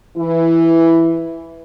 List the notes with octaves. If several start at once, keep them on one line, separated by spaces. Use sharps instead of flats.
E3 E4